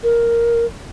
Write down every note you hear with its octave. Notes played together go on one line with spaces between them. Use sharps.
A#4